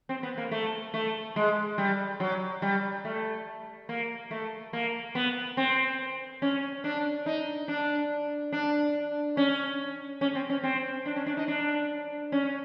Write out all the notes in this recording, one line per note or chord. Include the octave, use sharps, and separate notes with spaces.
C4
B3
A#3
A3
A3
G#3
G3
F#3
G3
A3
A#3
A3
A#3
B3
C4
C#4
D4
D#4
D4
D4
C#4
C#4
C4
C#4
C4
D4
C#4
D4
D#4
D4
C#4